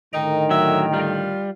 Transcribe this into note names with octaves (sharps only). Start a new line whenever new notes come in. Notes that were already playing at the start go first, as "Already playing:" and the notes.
A2 D3 D#3 D#4 D#5 G5 A#5
F#3 E5
G3 F4